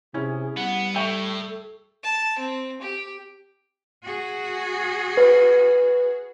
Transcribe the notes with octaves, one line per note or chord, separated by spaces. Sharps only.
C3 C#4 E4 G#4
G3 B3 F#5
A2 A4 E5 G5 C#6
A5
C4
G4
F#4 G#4
B4